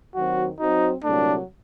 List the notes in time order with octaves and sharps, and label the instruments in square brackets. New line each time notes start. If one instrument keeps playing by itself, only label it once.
[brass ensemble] D#2 D#3 F#3 C4 [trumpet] F#4
[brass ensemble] F#3 C4 F#4 C5 [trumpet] D#4
[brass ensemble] C2 A#2 F#3 A3 [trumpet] D4